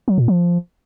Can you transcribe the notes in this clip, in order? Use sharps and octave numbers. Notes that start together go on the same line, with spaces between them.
F#3
A#2
F3